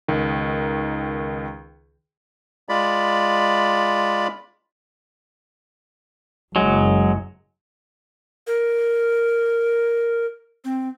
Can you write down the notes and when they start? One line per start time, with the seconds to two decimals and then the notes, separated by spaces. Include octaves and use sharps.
0.08 C#2 D#3
2.69 G#3 F4 D5 B5
6.56 F#1 F#3 G#3
8.47 A#4
10.65 C4